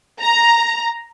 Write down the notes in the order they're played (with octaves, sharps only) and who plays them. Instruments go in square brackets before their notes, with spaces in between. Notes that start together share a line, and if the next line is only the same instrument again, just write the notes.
[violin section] A#5